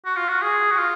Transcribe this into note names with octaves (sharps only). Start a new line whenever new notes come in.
F#4
F4
F#4
G#4
F#4
F4